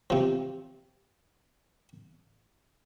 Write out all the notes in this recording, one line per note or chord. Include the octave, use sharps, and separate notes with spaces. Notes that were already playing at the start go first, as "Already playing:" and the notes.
C3 F3